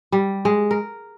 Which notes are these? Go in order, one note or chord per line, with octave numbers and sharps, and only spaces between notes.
G3
G#3
A#4